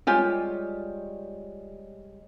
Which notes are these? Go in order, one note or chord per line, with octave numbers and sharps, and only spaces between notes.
G3 G#3 F4 G4 C#5 G#5